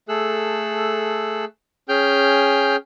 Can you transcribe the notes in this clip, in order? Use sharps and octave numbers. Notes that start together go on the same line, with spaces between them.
A3 G#4 A4 E6 F#6
C#4 G#4 G5 F6 G6